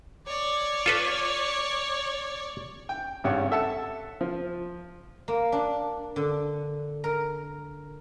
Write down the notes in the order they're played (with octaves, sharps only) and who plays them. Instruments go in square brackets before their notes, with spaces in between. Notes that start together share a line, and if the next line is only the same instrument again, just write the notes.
[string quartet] C#5 D5
[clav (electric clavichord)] F4 A4 B4
[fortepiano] G5
G#1 G2 C#5 F#5
A4 E5 F#5 A5
F3
[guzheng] A#3
D4
D3
A#4